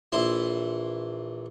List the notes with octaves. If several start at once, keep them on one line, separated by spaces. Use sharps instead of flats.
A#1 E3 E4 C6